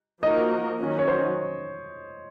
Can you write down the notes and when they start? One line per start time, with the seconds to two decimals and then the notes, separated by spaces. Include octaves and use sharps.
0.22 F3 A#3 D#4 F#4 A#4 D#5
0.79 D#3 F#3 C#4 F#4
0.99 C#5
1.08 C5